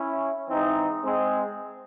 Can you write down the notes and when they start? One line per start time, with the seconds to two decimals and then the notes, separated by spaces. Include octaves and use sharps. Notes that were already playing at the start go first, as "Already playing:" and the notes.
Already playing: C#4 E4
0.48 G#2 E3 C4 D#4
1.04 G#3 C4